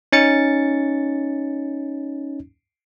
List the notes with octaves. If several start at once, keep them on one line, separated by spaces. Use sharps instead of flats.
C#4 D#4 A6 C#7